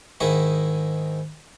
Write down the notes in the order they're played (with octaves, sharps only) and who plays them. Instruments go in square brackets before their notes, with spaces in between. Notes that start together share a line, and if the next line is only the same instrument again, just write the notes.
[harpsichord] G#2 D#3 E4 G#4 E5